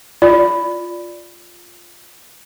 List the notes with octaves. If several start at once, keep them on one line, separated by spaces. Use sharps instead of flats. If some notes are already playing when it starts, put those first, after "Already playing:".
F4 D5